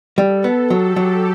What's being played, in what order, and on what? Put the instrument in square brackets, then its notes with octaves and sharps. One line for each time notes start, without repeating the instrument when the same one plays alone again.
[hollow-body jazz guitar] G3 [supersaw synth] A4
[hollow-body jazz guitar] B3
[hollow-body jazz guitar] F#3 [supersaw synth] G4
[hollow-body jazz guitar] F#3